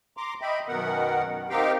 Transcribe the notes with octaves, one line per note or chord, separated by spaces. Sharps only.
A#5 C6 D6
D#5 E5 G5 B5
F#2 B2 D#3 B3 A#4 F#5
C4 D#4 G4 A#4 F5 G5